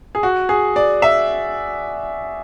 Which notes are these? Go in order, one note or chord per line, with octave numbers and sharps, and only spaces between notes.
G#4
F#4
G#4
D5
E5